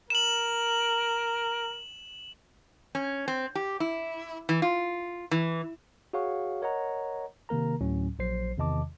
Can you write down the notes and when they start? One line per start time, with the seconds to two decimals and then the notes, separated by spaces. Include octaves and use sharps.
0.10 A#4 E7 F#7
2.95 C#4
3.28 C4
3.55 G4
3.80 E4
4.49 E3
4.62 F4
5.31 E3
6.13 F#4 G#4 C#5 F5 F#5 C#6
6.62 A#4 C#5 D#5 F#5 A#5
7.49 C3 D#3 A#3 A#4 A#5
7.81 D2 A2 F#3 C#4
8.19 A#1 F#3 C5 C7
8.58 E2 C3 D#3 D#5 A5 D6